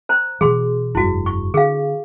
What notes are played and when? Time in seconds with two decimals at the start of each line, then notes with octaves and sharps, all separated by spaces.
0.09 C5 A#5
0.41 B2 E3 F#3 G#4 C6
0.95 F1 G2 E4 F#4
1.26 C#6
1.54 D3 G#4 F5